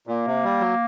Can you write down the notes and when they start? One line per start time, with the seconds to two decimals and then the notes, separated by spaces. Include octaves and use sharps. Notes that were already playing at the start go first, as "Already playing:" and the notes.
0.07 A#2 A#3
0.26 C3
0.44 G3
0.60 F#3